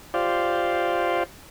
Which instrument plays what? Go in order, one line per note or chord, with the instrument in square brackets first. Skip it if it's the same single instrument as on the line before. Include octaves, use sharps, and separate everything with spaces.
[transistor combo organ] F4 G4 C5 D5 F5